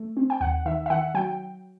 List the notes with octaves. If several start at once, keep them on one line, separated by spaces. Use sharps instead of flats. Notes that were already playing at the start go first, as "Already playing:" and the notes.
Already playing: A3
C4
G5
D#2 F#5
D#3 E5
E5
D#3 F#5
F#3 G5